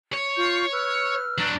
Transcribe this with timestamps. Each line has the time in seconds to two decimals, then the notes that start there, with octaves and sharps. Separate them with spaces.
0.14 C#5
0.37 F4 C#6 G6
0.72 B4 E6 F6
1.38 F#3 D4